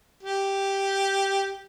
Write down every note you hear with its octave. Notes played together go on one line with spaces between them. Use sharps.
G4